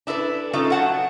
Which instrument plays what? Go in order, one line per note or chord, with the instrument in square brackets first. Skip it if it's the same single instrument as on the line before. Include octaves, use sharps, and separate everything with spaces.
[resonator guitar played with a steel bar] D4 E4 A4 B4
A3 C#4 D#4 F4 A4
F#3 F#5 A5